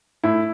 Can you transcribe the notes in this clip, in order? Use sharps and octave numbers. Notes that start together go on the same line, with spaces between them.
A2 E4